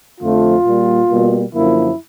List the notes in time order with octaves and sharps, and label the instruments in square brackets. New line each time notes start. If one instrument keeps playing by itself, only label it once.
[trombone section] F2 D3 F3 A3 F4
A#2 G3 A#3
B2 G3 A#3
F#2 D3 F3 A#3 E4